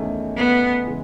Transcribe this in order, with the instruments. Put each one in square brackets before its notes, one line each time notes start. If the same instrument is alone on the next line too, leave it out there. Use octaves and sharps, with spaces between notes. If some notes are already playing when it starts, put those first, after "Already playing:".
Already playing: [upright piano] E2 D#3 A3 C#4
[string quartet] B3
[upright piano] C#3 E3 G#3